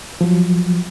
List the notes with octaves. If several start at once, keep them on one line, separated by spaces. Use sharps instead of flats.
F3 F#3